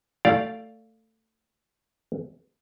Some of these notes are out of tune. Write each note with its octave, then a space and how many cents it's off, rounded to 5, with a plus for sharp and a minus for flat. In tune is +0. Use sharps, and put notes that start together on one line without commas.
A3 +20 D5 -5 F5 +0